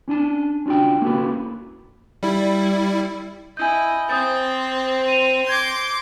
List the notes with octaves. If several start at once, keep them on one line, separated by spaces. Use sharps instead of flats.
C#4 D4 G#5 A5
C#4 D4 F4 F#4 G5
A#3 B3 C#4 F#4 A4 B4
G3 E4
E4 D#5 G#5 G6
C4 C5 D#6 G6 A6
D#7 F7
C6 D6 G6 G#6 A#6